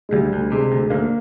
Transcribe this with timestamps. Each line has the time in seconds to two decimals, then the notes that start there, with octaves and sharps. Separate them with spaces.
0.09 G#3
0.13 D2 G3
0.33 D2
0.52 C3 G#3
0.72 D2
0.90 D2 A#3